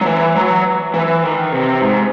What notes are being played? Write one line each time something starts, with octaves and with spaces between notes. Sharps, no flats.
F#3
E3
F#3
E3
D#3
C3
G#2